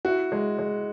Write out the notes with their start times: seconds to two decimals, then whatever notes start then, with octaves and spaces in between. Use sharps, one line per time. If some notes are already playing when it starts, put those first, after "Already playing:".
0.05 E4 F#4
0.32 G#3
0.59 G#3